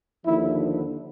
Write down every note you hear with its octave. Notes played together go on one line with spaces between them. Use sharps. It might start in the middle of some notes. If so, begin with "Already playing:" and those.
D#2 D3 F3 E4